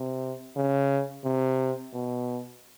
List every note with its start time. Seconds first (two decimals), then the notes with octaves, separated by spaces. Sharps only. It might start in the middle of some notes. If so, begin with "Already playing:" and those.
Already playing: C3
0.56 C#3
1.24 C3
1.93 B2